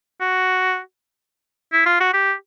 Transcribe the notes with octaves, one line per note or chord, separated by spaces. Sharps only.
F#4
E4
F4
F#4
G4